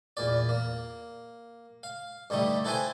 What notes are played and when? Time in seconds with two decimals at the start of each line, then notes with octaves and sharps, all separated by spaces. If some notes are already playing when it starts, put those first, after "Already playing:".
0.17 E2 A#2 D5
0.49 A#3
1.83 F5
2.30 G2 D3 G3 A3 D#4
2.64 E4 A4 B4 C5 G5 G#5